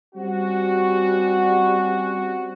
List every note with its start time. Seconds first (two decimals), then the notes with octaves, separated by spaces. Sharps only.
0.15 G3 C4 C#4 F#4